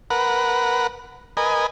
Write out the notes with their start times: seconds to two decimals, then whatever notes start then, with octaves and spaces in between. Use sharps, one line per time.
0.10 A#4 B4 F#5
1.37 A#4 B4 D#5 G#5